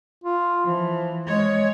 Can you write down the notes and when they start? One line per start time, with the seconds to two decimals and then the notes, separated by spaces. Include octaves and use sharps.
0.24 F4
0.66 E3 F3
1.28 G#3 C#5